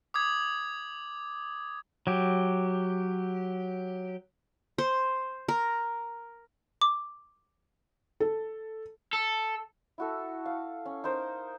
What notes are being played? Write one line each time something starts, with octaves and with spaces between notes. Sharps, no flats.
D6 D#6 G#6
F#3 G4
C5
A#4
D6
A4
A4
E4 F#4 A4
F5
C#4
D#4 A#4 C5